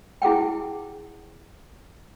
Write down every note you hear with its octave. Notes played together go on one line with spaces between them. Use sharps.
E4 G#4 F#5 G5